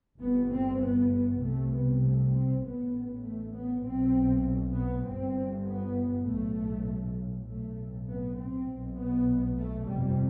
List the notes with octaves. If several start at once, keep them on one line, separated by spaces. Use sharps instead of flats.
G1 G2 B3
C4
B3
B3
C2 C3 A3
B3
A3
C4
A1 A2 B3
A3
B3
B1 B2 C4
B3
G1 G2 C4
B3
B1 A2 A3
B1 A2 A3
B3
C4
B1 B2
B3
A3
G1 F2 C3 G3